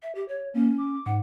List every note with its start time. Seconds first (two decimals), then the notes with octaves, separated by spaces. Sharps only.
0.03 E5
0.15 G4
0.28 C#5
0.54 A#3 C#4
0.78 D6
1.06 G#2 F#5